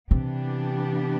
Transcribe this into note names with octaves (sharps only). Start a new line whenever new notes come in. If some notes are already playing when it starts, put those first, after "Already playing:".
C3 E3 B3 D4 G4